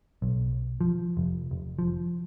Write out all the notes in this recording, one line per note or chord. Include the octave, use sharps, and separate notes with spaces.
B1
F3
F1
F1
F3